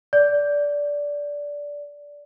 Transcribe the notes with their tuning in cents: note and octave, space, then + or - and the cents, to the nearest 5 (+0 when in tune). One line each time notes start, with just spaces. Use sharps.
D5 -15